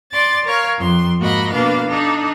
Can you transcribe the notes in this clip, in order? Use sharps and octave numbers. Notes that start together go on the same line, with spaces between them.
D5 C6 A6
A#4 C#5 F5
F2 C6
G#2 A#3 F#4 D#5 B5
B2 A#3 D4 B4 F5
D4 D#4 A4